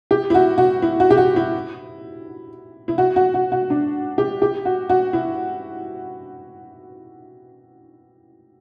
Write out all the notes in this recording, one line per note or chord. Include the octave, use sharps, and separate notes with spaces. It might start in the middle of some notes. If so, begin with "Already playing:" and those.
G4
E4
F#4
F#4
E4
F#4
G4
F#4
E4
E4
F#4
F#4
F#4
F#4
D4
G4
G4
F#4
F#4
E4